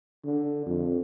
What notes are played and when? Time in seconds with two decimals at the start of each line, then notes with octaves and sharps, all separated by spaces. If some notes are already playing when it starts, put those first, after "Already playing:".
0.25 D3
0.66 F2